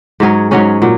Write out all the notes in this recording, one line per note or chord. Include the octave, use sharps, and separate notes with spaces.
G#2 F#3 C#4 G#4
G#2 F#3 C#4 G#4
A#2 F#3